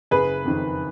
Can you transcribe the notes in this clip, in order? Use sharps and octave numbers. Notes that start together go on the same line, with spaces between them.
F#1 G#4 B4
F2 D#3